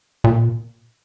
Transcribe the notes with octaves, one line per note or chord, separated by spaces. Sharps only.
A#2